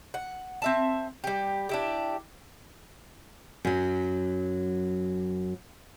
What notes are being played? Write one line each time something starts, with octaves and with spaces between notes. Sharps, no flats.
F#5
C4 E5 A5
G3 G4
D4 E4 G4
F#2 F#3